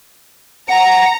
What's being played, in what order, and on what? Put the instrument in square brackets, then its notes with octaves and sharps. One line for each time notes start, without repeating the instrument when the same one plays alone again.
[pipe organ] F#5 [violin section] A#5